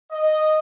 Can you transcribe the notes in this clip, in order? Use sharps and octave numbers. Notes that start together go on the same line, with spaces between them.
D#5